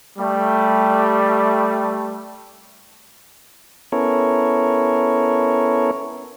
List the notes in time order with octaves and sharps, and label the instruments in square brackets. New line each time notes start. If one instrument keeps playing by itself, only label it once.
[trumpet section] G3 A3
[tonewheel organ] B3 C#4 E4 A4 A#4 C#5